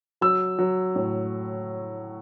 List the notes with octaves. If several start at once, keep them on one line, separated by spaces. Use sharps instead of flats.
F#3 E6
F#3
A2